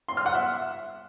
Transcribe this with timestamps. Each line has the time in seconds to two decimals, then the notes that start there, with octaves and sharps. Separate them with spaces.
0.08 C6
0.17 F6
0.26 F#5
0.35 E5